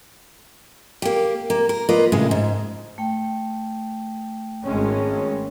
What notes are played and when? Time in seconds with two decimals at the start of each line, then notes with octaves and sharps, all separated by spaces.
1.02 A#3 G4
1.50 A#3
1.69 A#4
1.89 A#3 F4 B4 D#5
2.12 A2 C#3 G#3
2.31 G#2
2.98 A3 G5
4.64 G#1 G#3 C#4